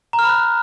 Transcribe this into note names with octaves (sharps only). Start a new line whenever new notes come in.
A#5
F6
B5
F#6
A#5